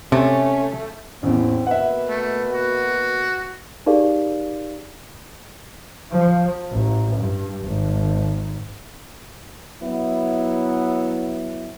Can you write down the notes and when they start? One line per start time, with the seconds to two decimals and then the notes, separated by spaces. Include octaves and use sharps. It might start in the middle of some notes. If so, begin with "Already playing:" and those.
0.12 C3 A3 C#4
1.23 A1 E2 C4
1.66 B2 A#3 B4 E5 F#5
2.09 A3
2.52 F#4
3.86 D#4 G4 G#4 A#4 D5 F5
6.12 F3
6.72 A1
7.17 G2
7.66 G#1
9.81 F#3 B3 E4